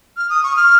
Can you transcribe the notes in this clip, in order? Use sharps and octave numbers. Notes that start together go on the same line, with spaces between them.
F6
D#6
C#6
F6